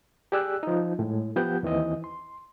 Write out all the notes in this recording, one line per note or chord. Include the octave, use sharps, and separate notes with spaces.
G4 G#4 D5 E6 F#6
F3 D#4
A2 G#3
F3 B3 G4 F#5 G6
D#2 E3 C4 D#5
C6